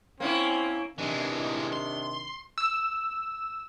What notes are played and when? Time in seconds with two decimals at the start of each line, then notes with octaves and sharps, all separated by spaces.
0.20 A#3 C4 C#4 E4
0.98 C3 D#3 E3 G#3 D4
1.73 C6
2.58 E6